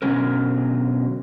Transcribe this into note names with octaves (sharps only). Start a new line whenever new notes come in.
B2 D3 D#3 F#3 C#4 A#4